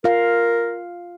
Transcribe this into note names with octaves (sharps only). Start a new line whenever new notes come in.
F4 A#4 F5